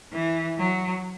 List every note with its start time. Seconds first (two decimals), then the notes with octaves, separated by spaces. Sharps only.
0.13 E3
0.58 F#3